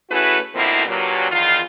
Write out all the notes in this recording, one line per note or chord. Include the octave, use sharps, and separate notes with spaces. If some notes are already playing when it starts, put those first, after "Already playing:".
A3 C#4 E4 F#4 G#4 B4
B2 D3 F3 A#3 C4 E4
G2 A#2 F#3
E2 D#3 F4